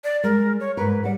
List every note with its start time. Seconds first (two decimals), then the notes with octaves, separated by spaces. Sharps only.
0.04 D5
0.24 G#3 A#4
0.60 C#5
0.77 G#2 A#4 B4
1.03 G3 D5 F#5